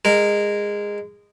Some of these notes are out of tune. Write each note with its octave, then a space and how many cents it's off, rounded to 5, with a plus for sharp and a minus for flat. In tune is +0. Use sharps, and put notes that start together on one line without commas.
G#3 -15 A#4 -10